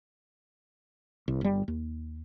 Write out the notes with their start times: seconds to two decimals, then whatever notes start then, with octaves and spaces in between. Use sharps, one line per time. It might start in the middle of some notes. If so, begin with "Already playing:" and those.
1.28 C2
1.41 G1 G3
1.68 D#2